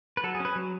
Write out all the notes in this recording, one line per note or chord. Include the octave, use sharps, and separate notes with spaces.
B4
F#3 A4
G#4
C#4 B4
F#3